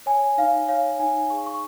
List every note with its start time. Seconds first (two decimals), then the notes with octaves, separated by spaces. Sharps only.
0.06 C#5 G#5
0.38 D#4 F5
0.68 C#5 F5
0.99 D#4 G#5
1.30 G#4 C#6
1.46 C#6